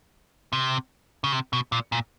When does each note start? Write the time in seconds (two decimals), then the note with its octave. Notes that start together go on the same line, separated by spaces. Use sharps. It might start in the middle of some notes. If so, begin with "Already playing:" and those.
0.53 C3
1.24 C#3
1.32 C3
1.53 B2
1.72 A#2
1.92 A#2